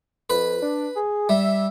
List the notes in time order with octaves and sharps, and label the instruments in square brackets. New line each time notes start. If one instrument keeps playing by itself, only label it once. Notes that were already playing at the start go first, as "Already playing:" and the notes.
[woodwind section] F2 [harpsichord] B4 B5
[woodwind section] D4
G#4
[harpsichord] G3 [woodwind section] E5